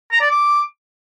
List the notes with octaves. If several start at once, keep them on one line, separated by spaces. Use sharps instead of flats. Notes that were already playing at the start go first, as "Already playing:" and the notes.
A#5
D5
D6